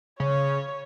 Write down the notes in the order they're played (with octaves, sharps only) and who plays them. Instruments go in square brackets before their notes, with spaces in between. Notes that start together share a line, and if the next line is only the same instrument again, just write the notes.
[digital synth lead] C#3 [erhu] C#5